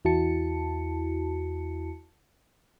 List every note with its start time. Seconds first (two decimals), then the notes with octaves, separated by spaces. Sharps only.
0.05 E2 E4 F#4 A5 C#7